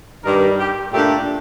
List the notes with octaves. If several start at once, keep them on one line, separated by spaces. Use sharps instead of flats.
G2 D#3 G3 A#4
G4
A#2 A3 D4 G4